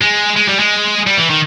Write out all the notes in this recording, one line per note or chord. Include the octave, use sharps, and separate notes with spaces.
G#3
G#3
G3
G#3
G3
E3
D#3